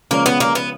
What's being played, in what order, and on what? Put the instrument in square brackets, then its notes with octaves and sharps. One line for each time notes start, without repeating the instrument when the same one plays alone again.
[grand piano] C#3 F3 G#3 C#4 [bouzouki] A#3
[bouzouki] B3
A#3
B3